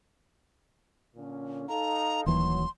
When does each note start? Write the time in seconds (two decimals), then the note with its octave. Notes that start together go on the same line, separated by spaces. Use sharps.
1.16 A#2 D3 C#4
1.68 D#4 A4 F5 A#5
2.26 D#1 D#2 E3 F#3 C6